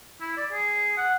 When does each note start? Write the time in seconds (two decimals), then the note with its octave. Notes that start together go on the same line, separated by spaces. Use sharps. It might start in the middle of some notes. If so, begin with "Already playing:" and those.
0.21 E4
0.37 D5
0.52 G#4
0.97 F#5